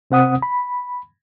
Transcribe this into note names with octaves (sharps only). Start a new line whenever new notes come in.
C3 C4 F#5 D#6
B5